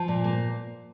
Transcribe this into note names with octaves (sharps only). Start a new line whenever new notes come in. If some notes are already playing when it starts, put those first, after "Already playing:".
Already playing: F3 A5
A#2
A#3